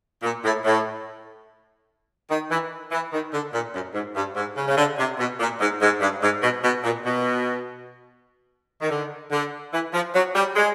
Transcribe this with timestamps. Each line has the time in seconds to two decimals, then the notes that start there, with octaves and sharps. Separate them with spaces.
0.23 A#2
0.44 A2
0.64 A2
2.30 D#3
2.51 E3
2.91 E3
3.13 D#3
3.33 D3
3.53 A#2
3.74 F#2
3.94 G#2
4.15 G2
4.36 G#2
4.57 C#3
4.68 C#3
4.77 D3
4.98 C3
5.19 B2
5.40 A#2
5.60 G#2
5.81 G#2
6.01 G2
6.22 G#2
6.43 B2
6.63 B2
6.84 A#2
7.05 B2
8.82 D#3
8.90 D3
9.31 D3
9.73 E3
9.94 F3
10.15 F#3
10.35 G3
10.56 G#3